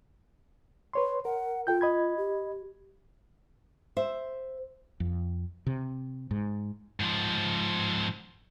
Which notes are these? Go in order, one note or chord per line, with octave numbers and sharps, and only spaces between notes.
B4 C#5 C6
A#4 F#5
F4 A4 G5 G6
D#5 B5 G#6
G4
C5 E5
F2
C3
G#2
G#2 F3